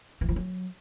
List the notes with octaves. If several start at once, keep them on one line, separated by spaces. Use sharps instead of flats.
E3
F3
F#3